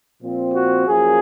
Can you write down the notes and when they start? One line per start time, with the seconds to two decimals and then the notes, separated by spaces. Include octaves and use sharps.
0.21 A#2 F3 C4
0.54 F#4
0.87 F#2 F3 A#3 G#4